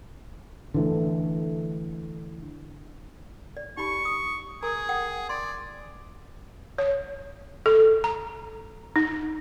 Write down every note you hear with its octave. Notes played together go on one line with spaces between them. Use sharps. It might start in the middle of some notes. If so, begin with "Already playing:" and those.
D3 E3 A3
D5
D#4 G4 B5 C#6
D#6
G#4 A#4 G#5 A#5
F#5 G5 D#6
D5 C6
C#5
A4
A#5
D#4